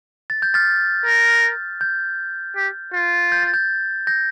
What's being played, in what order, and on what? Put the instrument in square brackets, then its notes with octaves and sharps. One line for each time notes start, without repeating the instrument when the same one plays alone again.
[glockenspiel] A6
G6
F6 A6
[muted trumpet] A#4
[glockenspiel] G6
[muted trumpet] G4
F4
[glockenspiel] G6
A6
G6
G6 A#6